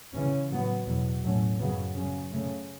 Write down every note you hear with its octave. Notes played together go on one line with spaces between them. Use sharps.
C#3 E3 C#4
A2 F#3 B3
E2 B2 F#3
A2 F#3 A3 C#4
F#2 C#3 F#3 B3
C#3 F#3 C#4
C#3 A3 C#4